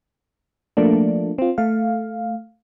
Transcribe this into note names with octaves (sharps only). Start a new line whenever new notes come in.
F3 A3 A#3 D4
C4 F4
A3 F5